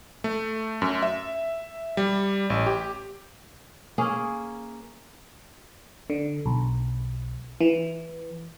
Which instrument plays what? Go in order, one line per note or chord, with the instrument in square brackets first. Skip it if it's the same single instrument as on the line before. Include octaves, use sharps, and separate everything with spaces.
[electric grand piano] A3
F#2
E5
G3
A1
G4
[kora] A#3 C#4 G#4
[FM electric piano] D3
B1
E3